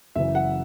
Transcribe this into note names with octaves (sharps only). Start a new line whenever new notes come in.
F#1 F#2 C#3 E3 E5
F#5